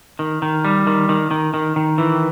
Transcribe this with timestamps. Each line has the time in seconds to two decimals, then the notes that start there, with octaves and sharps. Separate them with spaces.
0.19 D#3
0.42 D#3
0.65 G3
0.87 D#3
1.09 D#3
1.31 D#3
1.54 D#3
1.76 D#3
1.98 E3